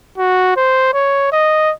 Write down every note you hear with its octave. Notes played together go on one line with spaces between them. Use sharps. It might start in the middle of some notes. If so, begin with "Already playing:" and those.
F#4
C5
C#5
D#5